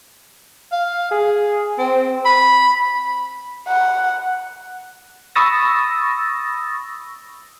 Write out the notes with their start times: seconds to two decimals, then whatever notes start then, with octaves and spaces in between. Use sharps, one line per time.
0.72 F5
1.11 G#4
1.79 C4
2.26 B5
3.68 F#5
5.36 B5 C#6 D#6 E6 A6 A#6